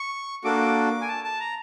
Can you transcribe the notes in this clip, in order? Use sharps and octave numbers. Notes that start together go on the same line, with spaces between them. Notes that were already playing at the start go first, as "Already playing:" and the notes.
Already playing: C#6
A#3 D4 F#4 A4 D6
G#5
A5
A5
A#5